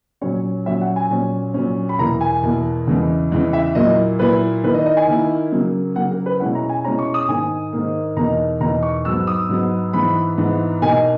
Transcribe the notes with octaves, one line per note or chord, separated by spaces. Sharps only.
A#2 F#3 C#4 C#5
A#2 F#3 C#4 E5
F#5
G#5
A#2 F#3 C#4
A#2 F#3 C#4
B5
E2 B2 A#3 E4 A#5
G#5
E2 B2 A#3 E4
E2 C#3 E3 G#3
E2 C#3 E3 G#3
E5
A#2 F#3 A#3 E4 D#5
A#2 F#3 A#3 E4 B4
D#3 A#3 E4 B4
D#5
D#5
G#5
D#3 A#3 E4
C#3 F#3 A#3
C#3 F#3 A#3 F#5
A#4
B4
B2 G#3 C#4 E4 F#5
A#5
G#5
B2 G#3 C#4 E4 A#5
C#6
D#6
G#2 D#3 A#3 G#5
G#2 D#3 A#3
E2 B2 A#3 D#4 A#5
E2 B2 A#3 D#4 A#5
C#6
G#2 F#3 B3 E6
D#6
G#2 F#3 B3
G#2 E3 B3 B5
G#2 E3 B3
B2 A#3 D#4 G#5